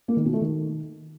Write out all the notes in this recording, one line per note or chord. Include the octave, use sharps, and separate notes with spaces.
A#3
D#3
B2
A3
D#3